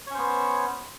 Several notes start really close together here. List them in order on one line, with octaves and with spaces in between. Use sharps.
C#5 C#4 C5 B3